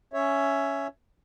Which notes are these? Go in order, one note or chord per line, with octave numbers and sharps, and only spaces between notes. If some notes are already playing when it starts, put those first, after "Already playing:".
C#4 C#5 E5